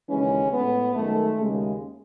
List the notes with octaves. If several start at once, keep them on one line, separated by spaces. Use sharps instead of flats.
D#2 C#3 E3 G#3 C#4
A2 G#3 B3
F#2 D#3 G#3 A3
D#2 C#3 G#3